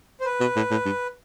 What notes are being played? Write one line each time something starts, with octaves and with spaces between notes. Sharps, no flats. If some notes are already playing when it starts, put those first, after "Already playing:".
C5
B4
B2
A2
A2
G2